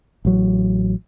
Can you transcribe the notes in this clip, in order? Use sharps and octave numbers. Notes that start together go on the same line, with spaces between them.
A1 F#3